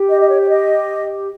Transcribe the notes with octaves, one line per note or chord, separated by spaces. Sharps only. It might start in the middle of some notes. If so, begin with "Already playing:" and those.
Already playing: G4
D#5
D#5
C#5
C#5
D#5